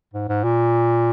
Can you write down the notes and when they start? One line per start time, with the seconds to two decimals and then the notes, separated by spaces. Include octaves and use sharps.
0.14 G#2
0.29 G#2
0.44 A#2